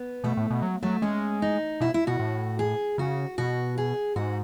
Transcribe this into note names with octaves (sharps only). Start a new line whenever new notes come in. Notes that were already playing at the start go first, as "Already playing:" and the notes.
Already playing: B3
B2 A3
A2
B2
F#3
F#3 A3
G#3 C#4
D#4
B2 E4
E4
B2 F#4
A2
G#4
C#3 F#4
B2 F#4
G#4
G#2 F#4